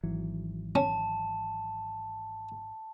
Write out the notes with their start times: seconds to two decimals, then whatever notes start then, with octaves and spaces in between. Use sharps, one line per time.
0.03 G#1 E3 F#3
0.75 C#4 A5